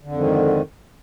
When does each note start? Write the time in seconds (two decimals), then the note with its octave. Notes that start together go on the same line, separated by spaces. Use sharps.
0.03 D3
0.07 F2
0.12 G#2
0.16 D#3